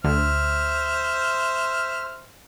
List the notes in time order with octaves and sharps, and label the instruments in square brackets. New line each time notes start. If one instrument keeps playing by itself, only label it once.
[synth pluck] D2 [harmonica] C5 E5 F6